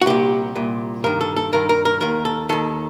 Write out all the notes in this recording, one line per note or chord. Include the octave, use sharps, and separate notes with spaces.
F#4
C2 A#2 G4
C2 A#2
G2 D#3 A#4
A4
A4
G2 D#3 A#4
A#4
A#4
D#2 D#3 A#4
A4
D#2 D#3 A4